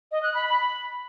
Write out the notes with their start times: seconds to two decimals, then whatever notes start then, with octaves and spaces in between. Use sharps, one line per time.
0.12 D#5
0.23 F#6
0.34 B5
0.45 B5